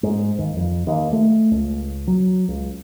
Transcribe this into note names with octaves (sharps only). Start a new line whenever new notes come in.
G#2
D#2
F2
D#2
A3
C#2
F#3
C#2